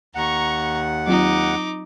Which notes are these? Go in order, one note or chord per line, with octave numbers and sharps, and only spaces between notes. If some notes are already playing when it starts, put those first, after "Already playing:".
D#2 F#5 A#5 C#6
F#3 C4 D#4 F4 D6